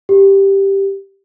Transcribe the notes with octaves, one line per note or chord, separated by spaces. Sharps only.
G4